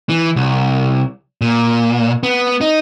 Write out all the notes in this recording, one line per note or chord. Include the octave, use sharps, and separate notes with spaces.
E3
C2
A#2
B3
D#4